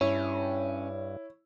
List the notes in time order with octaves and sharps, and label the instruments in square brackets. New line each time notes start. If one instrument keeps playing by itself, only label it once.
[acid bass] G2 [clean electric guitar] C#4 [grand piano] E4 [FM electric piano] C#5